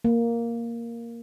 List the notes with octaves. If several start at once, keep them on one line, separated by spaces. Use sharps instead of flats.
A#3